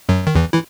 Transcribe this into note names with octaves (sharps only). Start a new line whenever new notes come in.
F#2 F#3
D#3
E2 E3
E3 E4